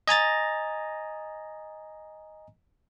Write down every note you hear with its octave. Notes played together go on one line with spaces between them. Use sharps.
D#5 G#5 A#5 A6